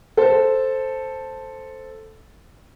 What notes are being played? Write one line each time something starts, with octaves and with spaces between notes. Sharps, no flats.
A4 C5